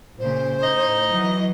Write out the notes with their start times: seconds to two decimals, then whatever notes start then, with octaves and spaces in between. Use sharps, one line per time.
0.19 A#2 C#3 C5
0.63 A2 D#4 D#5
1.12 E3 F#3